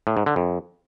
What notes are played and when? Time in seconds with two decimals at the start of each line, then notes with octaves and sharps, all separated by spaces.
0.07 A2
0.17 G#2
0.26 D3
0.36 F2